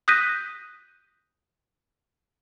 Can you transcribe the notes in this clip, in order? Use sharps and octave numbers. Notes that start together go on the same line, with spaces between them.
D#6 F#6 G6 A#6 B6 D#7